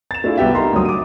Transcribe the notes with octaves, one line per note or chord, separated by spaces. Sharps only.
A6 E7
A3 D4 E4 F4 G#4
C2 B3 G4 E5
D#4 A#4 A#5 C6
D2 G2 F#3 D#6
D6 D#7